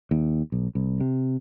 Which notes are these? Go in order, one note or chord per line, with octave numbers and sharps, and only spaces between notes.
D#2
B1
C2
C3